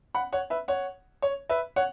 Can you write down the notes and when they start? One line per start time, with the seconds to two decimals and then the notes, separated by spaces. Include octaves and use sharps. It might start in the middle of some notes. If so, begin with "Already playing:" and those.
0.15 F#5 B5
0.32 C#5 F#5
0.50 B4 E5
0.68 C#5 F#5
1.22 C#5
1.49 B4 E5
1.76 C#5 F#5